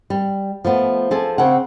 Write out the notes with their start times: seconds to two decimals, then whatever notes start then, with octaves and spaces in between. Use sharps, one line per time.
0.10 G3
0.65 F3 A3 B3
1.11 F3 G#4 A4
1.38 C#3 C4 F#5